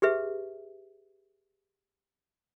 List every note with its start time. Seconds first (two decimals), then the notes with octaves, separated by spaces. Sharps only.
0.02 G4 G#4 B4 E5